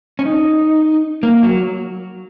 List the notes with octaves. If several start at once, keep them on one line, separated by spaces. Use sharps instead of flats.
C#4
D#4
A#3
F#3